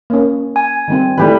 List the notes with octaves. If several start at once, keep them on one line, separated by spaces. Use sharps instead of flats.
A#3 C#4
G#5
D#3 G3 C4
D#3 E3 G3 A3 G4 B4